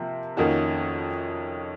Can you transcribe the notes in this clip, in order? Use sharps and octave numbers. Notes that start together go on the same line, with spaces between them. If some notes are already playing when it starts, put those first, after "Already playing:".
Already playing: C3 F3 A#3
F2 D#3 A#3 C#4 F#4